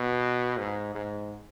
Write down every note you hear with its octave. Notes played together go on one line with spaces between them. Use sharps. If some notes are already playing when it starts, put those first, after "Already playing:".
Already playing: B2
G#2
G#2